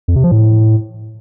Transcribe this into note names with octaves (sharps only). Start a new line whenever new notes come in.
F2
C3
F3
A2